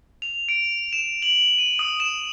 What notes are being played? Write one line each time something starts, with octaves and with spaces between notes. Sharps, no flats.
F7
D7
E7
F#7
D#7
D#6
E7